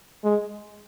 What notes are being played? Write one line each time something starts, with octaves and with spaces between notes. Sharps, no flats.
G#3